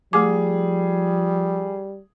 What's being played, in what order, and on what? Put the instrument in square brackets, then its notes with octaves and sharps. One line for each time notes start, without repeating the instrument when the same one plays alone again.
[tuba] F3 [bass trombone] G3 [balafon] A3 D6 [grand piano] G#4